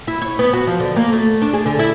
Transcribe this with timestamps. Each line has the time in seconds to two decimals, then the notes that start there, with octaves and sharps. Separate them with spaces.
0.07 E4
0.22 C#5
0.39 B3
0.53 F#4
0.67 F3
0.80 D3
0.96 A#3
1.12 A3
1.42 D4
1.53 G#4
1.66 D3
1.79 E4